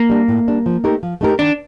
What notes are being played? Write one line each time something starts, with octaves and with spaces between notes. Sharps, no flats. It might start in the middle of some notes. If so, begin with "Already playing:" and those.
Already playing: A#3
G3 D4
A2
G3 D4
F3
A3 D#4 G4 A#4
F3
A3 D#4 G4 A#4
D#3 D4